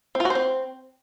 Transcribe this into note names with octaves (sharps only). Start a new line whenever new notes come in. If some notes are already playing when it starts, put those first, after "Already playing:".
C4
F4
F#4
C5
C4